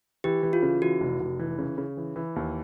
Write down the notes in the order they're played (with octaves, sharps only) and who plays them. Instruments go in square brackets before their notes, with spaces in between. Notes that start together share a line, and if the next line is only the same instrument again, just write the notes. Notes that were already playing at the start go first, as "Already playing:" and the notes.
[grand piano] E3 [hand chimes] G4
[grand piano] E3
[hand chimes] F4
[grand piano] C#3
[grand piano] E3 [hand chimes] F#4
[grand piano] F1
F1
E3
C#3
C#3
E3
E3
D#2